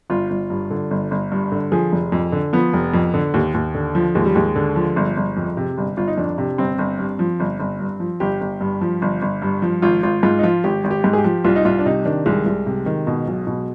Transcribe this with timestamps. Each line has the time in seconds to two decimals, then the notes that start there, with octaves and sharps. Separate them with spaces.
0.10 G1 F4
0.30 G1
0.50 G2
0.70 D3
0.91 G1
1.11 G1
1.32 G2
1.52 D3
1.72 F3 G#4
1.92 F1
2.12 F2
2.32 D3
2.53 F3 B3
2.73 F1
2.94 F2
3.14 D3
3.34 D#2
3.54 D#2
3.75 D3
3.95 F3
4.15 D#2 G#3
4.26 G3
4.35 D#2 G#3
4.56 D3
4.76 F3
4.96 G1
5.17 G1
5.37 F2
5.57 C3
5.78 G1
5.97 G1 F4
6.08 D#4
6.17 F2 D4
6.38 C3
6.58 G1 C4
6.78 G1
6.99 G2
7.19 F3
7.40 G1
7.60 G1
7.80 G2
8.00 F3
8.20 G1 G4
8.41 G1
8.61 G2
8.81 F3
9.02 G1
9.22 G1
9.42 G2
9.62 F3
9.82 G#1 F4
10.03 G#1 F4
10.23 G#2 F4
10.39 D#4
10.43 F3 F4
10.64 G#1 G4
10.84 G#1
10.91 G4
11.04 G#2
11.13 G#4
11.18 G4
11.24 F3
11.45 C2 F4
11.56 D#4
11.65 C2 F4
11.79 D4
11.86 C3 D#4
12.05 D#3 D4
12.26 C2 G#3
12.46 C2
12.66 C3
12.86 D#3
13.07 B2
13.27 B1
13.47 B2